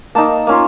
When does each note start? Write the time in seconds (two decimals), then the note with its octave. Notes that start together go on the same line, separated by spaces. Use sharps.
0.15 A#3 D#4 A5
0.47 A#3 C#4 F4